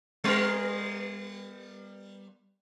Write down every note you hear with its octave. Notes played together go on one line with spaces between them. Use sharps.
G3 B3 A#4